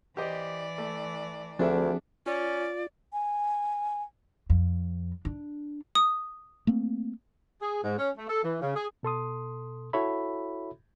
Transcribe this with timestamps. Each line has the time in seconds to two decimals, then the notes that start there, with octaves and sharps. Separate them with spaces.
0.17 E3 G4 C5 D5 D#5
0.78 A3
1.59 D2 F3 C4 D4 F#4 G#4 E5
2.26 C#4 F4 D5
3.13 G#5
4.50 F2
5.25 D4
5.95 D#6
6.67 A3 A#3 C4
7.61 G#4
7.83 G#2
7.98 C#4
8.17 A3
8.28 A4
8.43 E3
8.62 C#3
8.76 G#4
9.03 B2 A4 C6 D#6
9.93 E4 F#4 A4 C#5 E5 B5